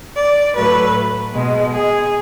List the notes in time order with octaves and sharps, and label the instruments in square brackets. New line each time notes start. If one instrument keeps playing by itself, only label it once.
[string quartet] D5
A2 F#3 A3 B4
B2 G#3
G#4